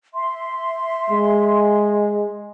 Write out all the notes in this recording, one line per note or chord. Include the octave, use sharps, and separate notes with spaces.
E5 C6
G#3